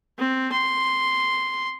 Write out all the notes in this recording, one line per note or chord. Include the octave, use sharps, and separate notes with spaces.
C4
C6